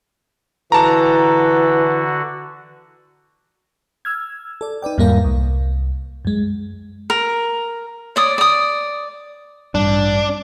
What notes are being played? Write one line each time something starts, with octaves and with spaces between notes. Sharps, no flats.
D3 E3 F#4 A5 A#5
E6 F6 G#6
A4 D5
D#4 B4 D5 G5
E2 G#2 G3 A#3 A#4 F5
C2
F#2 G#3
A#4
C#5 D5 D#6
D5 D#6
A1 G2 D4